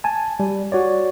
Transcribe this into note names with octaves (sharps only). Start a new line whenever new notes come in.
G#5 A5
G3
F#4 C#5 D5